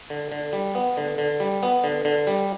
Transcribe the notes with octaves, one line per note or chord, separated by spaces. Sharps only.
D3
D3
G3
B3
D3
D3
G3
B3
D3
D3
G3